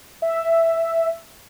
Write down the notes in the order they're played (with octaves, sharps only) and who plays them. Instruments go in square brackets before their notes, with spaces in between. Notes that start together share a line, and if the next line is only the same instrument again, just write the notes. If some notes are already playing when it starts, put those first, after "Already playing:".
[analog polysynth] E5